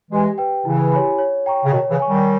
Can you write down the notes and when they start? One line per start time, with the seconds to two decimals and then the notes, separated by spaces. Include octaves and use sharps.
0.11 E3 G#3 G4
0.38 B4 G5
0.65 C#3 E3 E4
0.92 G4 C#5 G#5 B5
1.18 C#5
1.46 G5 A#5 C#6
1.64 C#3
1.72 B2 D#3 C#5
1.90 C#3 E3
2.00 G#5 C#6
2.08 D#3 G3